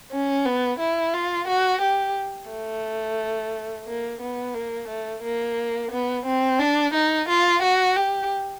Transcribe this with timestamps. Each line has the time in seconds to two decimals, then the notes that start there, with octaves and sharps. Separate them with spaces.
0.12 C#4
0.45 B3
0.79 E4
1.13 F4
1.48 F#4
1.81 G4
2.50 A3
3.87 A#3
4.21 B3
4.54 A#3
4.88 A3
5.23 A#3
5.91 B3
6.25 C4
6.59 D4
6.94 D#4
7.28 F4
7.62 F#4
7.96 G4